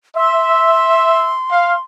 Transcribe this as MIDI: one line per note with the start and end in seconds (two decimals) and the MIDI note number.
0.16 1.35 76
0.16 1.80 84
1.51 1.74 77